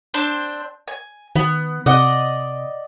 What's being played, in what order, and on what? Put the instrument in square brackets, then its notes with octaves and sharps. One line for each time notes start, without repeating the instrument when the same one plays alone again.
[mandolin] C4 D4 C5
G#5
[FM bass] D#3 [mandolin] B3
[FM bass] C3 [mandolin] D5 D#5 F#5